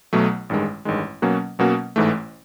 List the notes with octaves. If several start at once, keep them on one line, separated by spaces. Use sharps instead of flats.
B1 B2 F#3 A3
A1 G2 D#3 G#3
A1 G2 D#3 G#3
B2 F#3 A#3 C#4 F#4
B2 F#3 A#3 C#4 F#4
A1 G#2 E3 A3